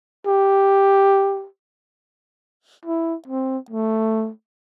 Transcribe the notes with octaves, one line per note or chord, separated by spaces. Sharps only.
G4
E4
C4
A3